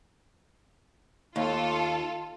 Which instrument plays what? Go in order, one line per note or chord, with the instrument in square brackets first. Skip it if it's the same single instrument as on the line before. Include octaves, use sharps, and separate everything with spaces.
[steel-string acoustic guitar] D#2 [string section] F4 A4